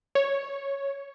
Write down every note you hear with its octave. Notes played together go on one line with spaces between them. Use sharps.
C#5